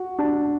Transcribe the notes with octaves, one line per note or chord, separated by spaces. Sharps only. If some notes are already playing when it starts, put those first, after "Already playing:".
Already playing: F#4
D4